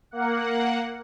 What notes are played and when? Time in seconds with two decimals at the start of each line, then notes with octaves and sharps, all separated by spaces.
0.11 A#3 F#5